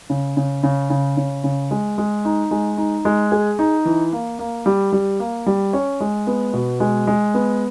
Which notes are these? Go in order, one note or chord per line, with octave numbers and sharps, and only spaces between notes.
C#3
C#3
C#3
C#3
C#3
C#3
G#3
G#3
D#4
G#3
D#4
G#3
G#4
D#4
E3
A#3
A#3
G3
G3
A#3
G3
C#4
G#3
B3
B2
G#3
G#3
B3